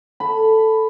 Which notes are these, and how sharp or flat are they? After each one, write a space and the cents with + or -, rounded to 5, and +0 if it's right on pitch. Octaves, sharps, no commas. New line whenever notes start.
A4 +0 B5 +5